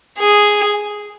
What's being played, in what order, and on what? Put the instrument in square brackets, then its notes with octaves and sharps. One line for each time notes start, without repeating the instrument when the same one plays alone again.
[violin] G#4